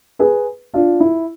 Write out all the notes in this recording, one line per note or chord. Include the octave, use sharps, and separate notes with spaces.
G#4 B4
D4 F4
E4